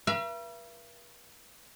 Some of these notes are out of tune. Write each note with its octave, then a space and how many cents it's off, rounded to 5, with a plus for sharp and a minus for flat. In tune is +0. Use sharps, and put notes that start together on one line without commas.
B4 -45 E5 +45